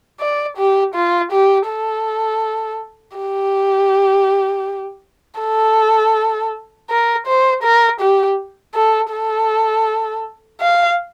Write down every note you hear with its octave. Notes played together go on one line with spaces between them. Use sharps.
D5
G4
F4
G4
A4
G4
A4
A#4
C5
A#4
G4
A4
A4
F5